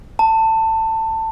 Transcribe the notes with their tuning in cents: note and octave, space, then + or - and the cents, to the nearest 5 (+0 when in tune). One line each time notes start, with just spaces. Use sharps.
A5 +20